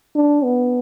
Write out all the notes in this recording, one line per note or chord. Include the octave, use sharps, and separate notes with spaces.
D4
B3